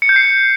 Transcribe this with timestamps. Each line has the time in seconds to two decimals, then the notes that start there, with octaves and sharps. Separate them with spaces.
0.02 C#7
0.09 G6
0.16 C7